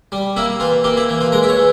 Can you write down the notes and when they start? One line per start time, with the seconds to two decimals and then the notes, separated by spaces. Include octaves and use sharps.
0.12 G3
0.36 A#3 E4
0.60 E3 F4
0.84 A#3 G4
0.97 E4
1.09 E3
1.21 F4
1.32 G#3 A#4
1.43 E5
1.49 C#5
1.57 E3